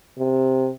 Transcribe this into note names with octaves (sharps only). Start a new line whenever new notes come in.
C3